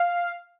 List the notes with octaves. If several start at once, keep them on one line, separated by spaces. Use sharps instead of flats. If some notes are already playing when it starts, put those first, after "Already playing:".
Already playing: F5